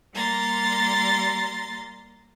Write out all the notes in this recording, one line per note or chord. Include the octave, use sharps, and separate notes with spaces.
G3 A#3 A#5 C6 A6